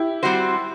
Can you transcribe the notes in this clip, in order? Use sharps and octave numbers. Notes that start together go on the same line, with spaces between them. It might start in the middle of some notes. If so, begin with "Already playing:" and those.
Already playing: E4 G4
G3 C4 F#4 C5